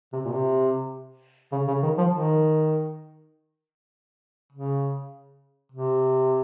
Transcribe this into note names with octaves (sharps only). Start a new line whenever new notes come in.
C3
A#2
C3
C#3
C#3
D#3
F3
D#3
C#3
C3